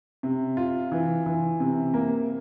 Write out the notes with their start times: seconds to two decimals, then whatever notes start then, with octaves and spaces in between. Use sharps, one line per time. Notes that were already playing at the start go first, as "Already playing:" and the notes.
0.23 C3
0.57 F4
0.92 E3
1.26 E3
1.60 C3
1.94 A#3